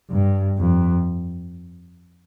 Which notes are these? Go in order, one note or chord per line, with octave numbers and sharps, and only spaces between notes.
G2
F2